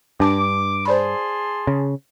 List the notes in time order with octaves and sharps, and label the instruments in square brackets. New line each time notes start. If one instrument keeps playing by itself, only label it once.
[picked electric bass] G2 [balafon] D4 A5 [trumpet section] D6
[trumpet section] G#4 A5 C6 [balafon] C5 D5 B5
[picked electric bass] C#3